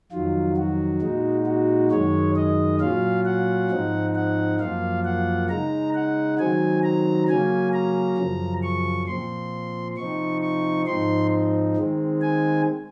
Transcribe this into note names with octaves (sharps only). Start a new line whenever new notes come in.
F2 D#3 F#3 F4
F#4
A#2 G#3 D#4
F#4
F#2 D#3 G#3 C#5
D#5
A#2 F#3 C#4 F4 F5
F#5
G#2 F3 C4 D#4
F#5
F#2 F3 A#3 F4 F5
F#5
C#3 G#3 D#4 A#5
F#5
D#3 F#3 C4 G#5
A#5
C#3 F#3 A#3 C#4 G#5
A#5
F#2 C#3 F3
C#6
A#2 F3 C4 C6
C3 F3 C4 D#4 C#6
C#6
G#2 F3 C4 D#4 C6
D#3 G#3 C4
G#5